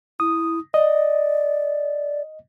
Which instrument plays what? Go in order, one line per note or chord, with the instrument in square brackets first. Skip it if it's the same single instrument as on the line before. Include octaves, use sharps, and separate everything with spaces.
[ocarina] E4 [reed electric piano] D#6
[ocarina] D5 [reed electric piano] D#5